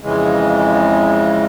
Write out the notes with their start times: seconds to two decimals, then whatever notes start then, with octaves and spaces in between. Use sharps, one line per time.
0.01 F2 C#3 E3 G#3